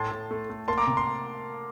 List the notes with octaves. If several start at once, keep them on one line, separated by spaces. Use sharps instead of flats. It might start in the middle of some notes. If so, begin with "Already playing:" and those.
Already playing: A2 A5 C6
A2
A3
A3
A#3 A5 C6
A#5 D6
C3
C6